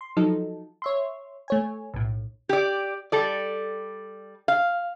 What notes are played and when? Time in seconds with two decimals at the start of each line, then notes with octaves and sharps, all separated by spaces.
0.01 C6
0.17 F3 F#3 D#4 A4
0.82 C#5 E5 C6
1.48 A3 C#5 G#5
1.93 B1 A2
2.49 G4 D5
3.12 G3 A4 D5
4.48 F5